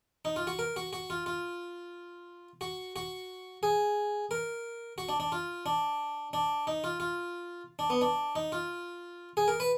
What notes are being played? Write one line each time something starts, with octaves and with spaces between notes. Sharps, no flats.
D#4
F4
F#4
A#4
F#4
F#4
F4
F4
F#4
F#4
G#4
A#4
F#4
D4
D4
F4
D4
D4
D#4
F4
F4
D4
B3
D4
D#4
F4
G#4
A#4
B4